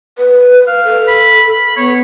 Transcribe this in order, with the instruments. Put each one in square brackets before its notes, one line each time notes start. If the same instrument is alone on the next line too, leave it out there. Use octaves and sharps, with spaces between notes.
[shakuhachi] B4
[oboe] F5
[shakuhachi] A4
[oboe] B5
[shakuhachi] B3 [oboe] C#5